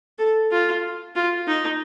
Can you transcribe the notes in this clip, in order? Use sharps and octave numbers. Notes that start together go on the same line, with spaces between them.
A4
F4
F4
D#4